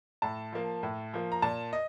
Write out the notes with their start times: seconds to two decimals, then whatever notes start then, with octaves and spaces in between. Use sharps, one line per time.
0.22 A2 A5
0.52 F3 A#3
0.83 A2
1.13 F3 A#3
1.32 A#5
1.42 A#2 A5
1.73 D#5